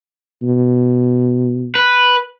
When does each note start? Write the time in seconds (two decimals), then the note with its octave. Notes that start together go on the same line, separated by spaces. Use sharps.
0.43 B2
1.75 B4